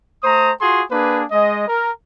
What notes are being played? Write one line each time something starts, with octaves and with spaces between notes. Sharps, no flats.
A3 C5 A#5 D#6
F4 F#4 G#4 C6
A#3 D4 G#4 B4
G#3 D#5
A#4